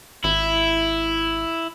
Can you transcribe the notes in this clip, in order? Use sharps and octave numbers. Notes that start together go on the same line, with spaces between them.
G#1 E4